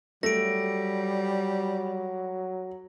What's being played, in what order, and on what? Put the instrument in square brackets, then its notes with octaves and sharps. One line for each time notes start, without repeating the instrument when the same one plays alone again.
[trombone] F#3 [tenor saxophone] G3 [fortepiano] A3 [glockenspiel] A#6 D7